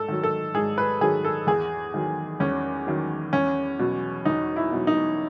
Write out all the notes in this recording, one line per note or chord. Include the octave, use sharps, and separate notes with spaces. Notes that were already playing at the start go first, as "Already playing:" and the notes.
Already playing: G#2 A4
D#3 F#3
A4
G#2 G#4
B4
D#3 F#3 G#4
A4
E2 G#4
D#3 F#3
E2 C#4
D#3 F#3
E2 C#4
B2 F#3
E2 D#4
E4
B2 F#3
D#4